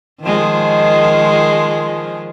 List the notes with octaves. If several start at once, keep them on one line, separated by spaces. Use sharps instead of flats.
D#3 F3 G#3